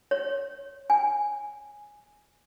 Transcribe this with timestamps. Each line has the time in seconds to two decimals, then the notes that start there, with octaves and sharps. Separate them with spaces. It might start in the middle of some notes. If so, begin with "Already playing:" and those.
0.11 C#5
0.90 G#5